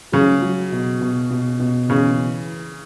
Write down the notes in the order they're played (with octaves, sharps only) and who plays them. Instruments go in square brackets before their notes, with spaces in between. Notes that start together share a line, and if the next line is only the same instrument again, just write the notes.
[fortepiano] C#3 [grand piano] F#3
[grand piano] F#3
B2
B2
B2
B2
[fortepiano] C#3 [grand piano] E3